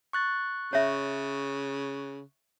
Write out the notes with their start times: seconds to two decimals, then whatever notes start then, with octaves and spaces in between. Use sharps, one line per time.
0.13 C#6 F#6 A6
0.73 C#3 C#5 E5